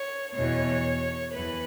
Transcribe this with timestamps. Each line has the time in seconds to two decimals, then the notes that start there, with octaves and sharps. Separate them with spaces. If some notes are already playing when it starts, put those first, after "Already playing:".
Already playing: C#5
0.34 E2 B2 C#5
1.34 E2 B4